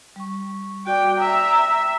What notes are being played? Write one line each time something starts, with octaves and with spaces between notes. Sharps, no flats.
G3 C#6
F#4 D5 G5 D6
E5 G5 A#5